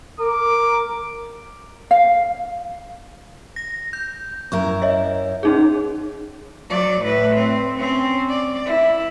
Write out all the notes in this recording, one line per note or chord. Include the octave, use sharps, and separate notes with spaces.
A#4 D6
F5
A#6
G6
F#2 E4 A#4 C#6
C#5 D#5 E5
C#4 D#4 G#4
F#3 D5
A2 B4
C4
C4 C#4
D5
E4